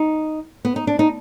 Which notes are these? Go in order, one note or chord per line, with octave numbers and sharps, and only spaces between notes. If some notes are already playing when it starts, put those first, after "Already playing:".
Already playing: D#4
B3
D#4
D4
D#4